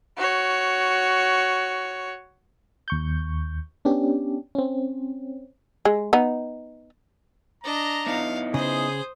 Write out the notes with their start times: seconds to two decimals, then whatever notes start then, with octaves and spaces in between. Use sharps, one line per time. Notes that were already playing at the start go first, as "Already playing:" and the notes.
0.17 F#4 C#5
2.88 D#2 C#6 G6
3.85 B3 C#4 D4 G4
4.55 C4 C#4
5.85 G#3
6.13 B3 D#4
7.64 D4 D#5 A#5
8.07 B3 D#4 E4 F5
8.54 C#3 G#4 C5 D#6